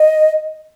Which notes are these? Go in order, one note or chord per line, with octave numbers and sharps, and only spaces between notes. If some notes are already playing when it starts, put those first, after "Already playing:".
Already playing: D#5